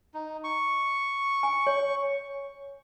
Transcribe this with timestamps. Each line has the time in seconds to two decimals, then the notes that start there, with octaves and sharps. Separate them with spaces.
0.14 D#4
0.44 C#6
1.43 G#5
1.67 C#5